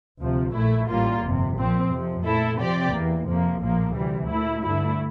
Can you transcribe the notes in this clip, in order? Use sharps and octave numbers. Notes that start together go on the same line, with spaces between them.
D2 C3 F3
A#1 A#2 A3 E4
A1 A2 G3 A#3 F4
G1 F2 C3
A#1 A#2 F3 C4
F2 C3 F3
A#2 A3 E4 A4
C3 F3 C4 G4 D5
E2 E3 A#3
F2 C3 F3 A#3
A#1 A2 F3 A#3
D2 C3 E3 G3
A#2 A3 E4
G2 D3 A3 E4